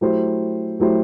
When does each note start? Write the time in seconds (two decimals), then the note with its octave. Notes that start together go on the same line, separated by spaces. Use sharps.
0.01 F#3 A3 E4 G4 C5
0.80 F#3 A3 E4 G4 C5